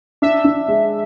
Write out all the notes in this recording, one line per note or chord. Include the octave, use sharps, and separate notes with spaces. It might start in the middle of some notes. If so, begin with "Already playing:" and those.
D4 E5
D4
G#3